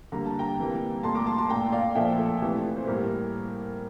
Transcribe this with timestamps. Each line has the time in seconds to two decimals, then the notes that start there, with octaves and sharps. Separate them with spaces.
0.12 D3 G3 A#3 A#5
0.25 A5
0.39 G5 A#5
0.58 C3 E3 G3 A#3
1.03 A#2 A3 A5 C6
1.15 A#5 D6
1.26 A5 C6
1.38 A5 C6
1.49 A#2 A3 G5 A#5
1.72 D5 F5
1.95 A#2 F3 A3 E5 G5
2.19 A4
2.42 C3 E3 A3 G4
2.77 C5
2.87 A2 G3 A#3 G4 A#4